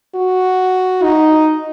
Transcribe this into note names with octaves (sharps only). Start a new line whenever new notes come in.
F#4
D#4